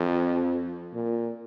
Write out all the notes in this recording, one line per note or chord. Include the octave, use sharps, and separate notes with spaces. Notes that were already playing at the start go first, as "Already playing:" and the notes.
Already playing: F2
A#2